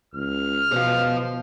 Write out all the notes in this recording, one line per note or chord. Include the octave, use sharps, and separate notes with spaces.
C#2 F6
B2 C5 F5